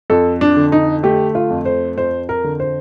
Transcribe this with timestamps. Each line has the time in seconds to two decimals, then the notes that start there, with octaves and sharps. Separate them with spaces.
0.10 F2 A4
0.41 D4
0.57 D3
0.72 D#4
1.03 A3 G4
1.35 F4
1.50 F2
1.66 C5
1.97 F2 C5
2.29 A#4
2.44 D3
2.60 C5